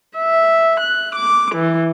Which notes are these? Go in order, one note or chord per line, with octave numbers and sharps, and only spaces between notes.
E5
F#6
D6
E3